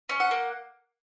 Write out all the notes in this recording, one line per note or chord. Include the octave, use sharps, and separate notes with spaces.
C#4
F#5
A#3